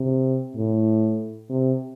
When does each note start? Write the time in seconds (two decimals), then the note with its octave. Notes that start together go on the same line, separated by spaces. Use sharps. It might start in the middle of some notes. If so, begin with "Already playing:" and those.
Already playing: C3
0.56 A2
1.50 C3